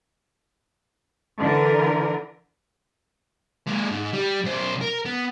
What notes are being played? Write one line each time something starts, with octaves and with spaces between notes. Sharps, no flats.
D3 E3 A#4
G#3 A#3
G#2
G3
B1 C5
A#4
B3